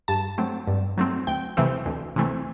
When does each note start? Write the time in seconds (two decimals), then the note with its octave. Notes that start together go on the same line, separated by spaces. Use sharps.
0.08 G2 A5
0.38 F#3 A3 C4
0.67 G2
0.97 F#3 A3 C4
1.27 D2 G5
1.57 C3 E3 A3 C4
1.86 D2
2.16 C3 E3 A3 C4